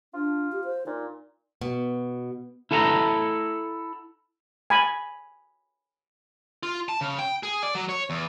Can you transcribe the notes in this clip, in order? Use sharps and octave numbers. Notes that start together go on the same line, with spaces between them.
D4 F4
G4
C5
A#2 D#4
B2
E4 A4 F#5 A5 A#5
G#5 B5
F4
A5
C#3
G5
G#4
D5
F#3
C#5
E2